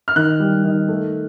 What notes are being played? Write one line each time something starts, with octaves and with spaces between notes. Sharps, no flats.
F6
D#3 F#6
G3
D#3
A3